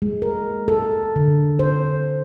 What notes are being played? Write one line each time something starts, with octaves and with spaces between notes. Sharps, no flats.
G#3
A#4
A4
D3
C5